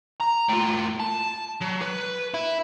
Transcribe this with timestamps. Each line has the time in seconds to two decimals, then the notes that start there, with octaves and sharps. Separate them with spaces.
0.21 A#5
0.49 A2 F4
1.00 A5
1.61 F#3
1.81 B4
2.34 E4